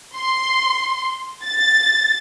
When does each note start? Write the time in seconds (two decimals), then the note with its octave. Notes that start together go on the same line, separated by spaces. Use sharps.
0.16 C6
1.44 A6